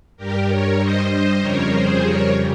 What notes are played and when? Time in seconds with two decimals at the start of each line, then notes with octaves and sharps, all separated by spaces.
0.17 G2 G3 G4 A#4
0.48 A#4 C#5
0.79 C5 D#5
1.10 C5 D#5
1.41 F2 C#3 G3 A#4 C#5
1.72 G#4 C5
2.02 A#4 C#5